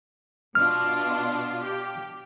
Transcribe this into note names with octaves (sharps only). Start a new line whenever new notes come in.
B2 D4 F4 F6
G4